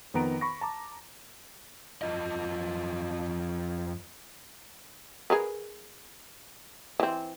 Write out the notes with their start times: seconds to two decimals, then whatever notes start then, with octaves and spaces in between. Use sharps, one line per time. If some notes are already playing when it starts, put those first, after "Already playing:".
0.14 F2 D#3 B3 A#5 D7
0.41 B5 C#6 A#6
0.61 A5 A#5 D6
2.02 F2 F4 D#5
5.30 G#4 A#4 B4
7.00 E3 C4